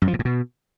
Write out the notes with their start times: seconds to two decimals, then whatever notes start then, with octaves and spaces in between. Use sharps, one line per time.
0.02 F#2
0.08 F3
0.13 A#2
0.19 A2
0.25 B2